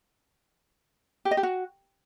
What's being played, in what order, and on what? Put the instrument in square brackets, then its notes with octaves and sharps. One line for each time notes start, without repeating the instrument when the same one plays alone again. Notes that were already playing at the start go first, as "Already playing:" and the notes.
[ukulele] G4
D#5
G4
F#4